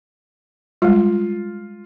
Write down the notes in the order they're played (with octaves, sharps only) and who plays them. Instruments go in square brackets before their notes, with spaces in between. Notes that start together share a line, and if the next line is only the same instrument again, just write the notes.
[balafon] G3 G#3 [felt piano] F4